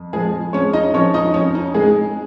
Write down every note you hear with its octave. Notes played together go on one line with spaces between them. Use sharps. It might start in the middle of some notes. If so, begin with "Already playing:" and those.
Already playing: F2
F3 G#3 G#4
G#3 C#4 C#5
D#4 D#5
F3 C#4 C#5
D#4 D#5
F2 C#4
D#4
G#3 G#4